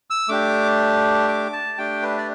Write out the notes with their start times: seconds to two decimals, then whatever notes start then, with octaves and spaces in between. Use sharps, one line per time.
0.10 E6
0.28 A3 D4 G4 D6
1.28 D6
1.53 A5
1.78 A3 D4 G4 G5
2.02 B4
2.18 D5